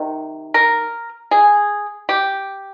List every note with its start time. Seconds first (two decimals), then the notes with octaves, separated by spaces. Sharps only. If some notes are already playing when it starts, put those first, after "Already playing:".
Already playing: C3 D#3
0.54 A#4
1.31 G#4
2.09 G4